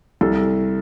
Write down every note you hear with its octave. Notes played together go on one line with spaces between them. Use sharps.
C2 A4